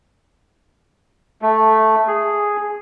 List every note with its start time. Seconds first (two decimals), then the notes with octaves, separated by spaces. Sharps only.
1.42 A3
2.08 G#4